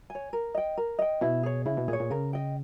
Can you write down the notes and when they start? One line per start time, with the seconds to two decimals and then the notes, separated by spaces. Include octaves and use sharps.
0.10 G#5
0.15 C#5
0.33 A#4
0.54 D#5 G5
0.77 A#4
0.99 D#5 G5
1.21 B2 E4
1.43 G#4 C#5
1.65 C#3 E4
1.77 B2
1.88 A#2 G#4
1.93 C#5
2.00 A#2
2.11 C#3 A#4
2.33 D#5 G5